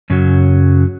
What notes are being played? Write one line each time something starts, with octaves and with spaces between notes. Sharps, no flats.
F#2 C#3 F#3